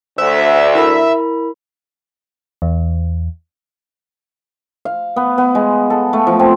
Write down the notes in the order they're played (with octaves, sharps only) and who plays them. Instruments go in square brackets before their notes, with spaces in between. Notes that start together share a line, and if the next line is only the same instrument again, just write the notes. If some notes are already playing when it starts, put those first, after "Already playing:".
[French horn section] D2 [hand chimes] C5 [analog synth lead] E5
[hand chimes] E4 A#4 B5
[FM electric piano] E2
[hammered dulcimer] F5
B3
B3
G#3
A4
A3
F3
C4